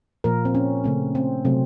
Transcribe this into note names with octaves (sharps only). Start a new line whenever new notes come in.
A#2 F3 A#3 A#4
C4
C#4
C#3 A3 C4
C4
C3 F#3 A3 C4